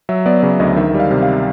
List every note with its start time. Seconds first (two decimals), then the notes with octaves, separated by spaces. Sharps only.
0.09 F#3 E5
0.26 B3 D5
0.43 C#3 D5
0.60 D2 D#5
0.76 D#3 E5
0.94 G3
1.00 F5
1.11 C3
1.23 F5